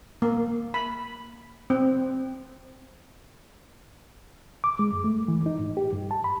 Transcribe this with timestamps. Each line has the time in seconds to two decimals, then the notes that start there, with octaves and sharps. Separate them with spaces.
0.22 A#3
0.74 B5
1.70 C4
4.64 D6
4.79 G#3
4.93 F#2
5.04 A3
5.28 E3
5.46 D#4
5.59 G#2
5.77 G4
5.93 G2
6.11 A5
6.24 B5